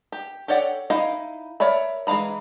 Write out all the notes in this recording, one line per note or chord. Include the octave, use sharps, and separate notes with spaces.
G4
G4 A4 C#5 D5 F#5
D#4 E4 D#5 F5
A#4 C#5 D5 E5 B5
E3 G#3 F5 A#5 B5